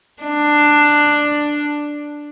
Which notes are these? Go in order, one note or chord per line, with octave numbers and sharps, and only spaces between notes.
D4